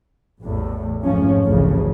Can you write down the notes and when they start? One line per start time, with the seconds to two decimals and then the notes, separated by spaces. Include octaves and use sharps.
0.40 A1 E2 A2
1.03 F1 G#2 F3 C#4
1.46 A1 D2 C#3 F3